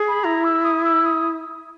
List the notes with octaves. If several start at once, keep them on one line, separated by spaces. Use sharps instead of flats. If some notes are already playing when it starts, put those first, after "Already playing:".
Already playing: G#4
B5
E4 A#5
E6
D#6
E6
D#6